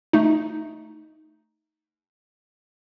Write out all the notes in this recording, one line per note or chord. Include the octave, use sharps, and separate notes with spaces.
A3 D#4